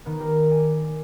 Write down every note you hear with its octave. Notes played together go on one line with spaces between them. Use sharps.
D#3 B3
G4 A#4
D5 G#5 D#7